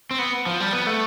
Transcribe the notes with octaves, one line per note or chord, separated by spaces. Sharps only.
C4
B3
F3
G3
B3
A3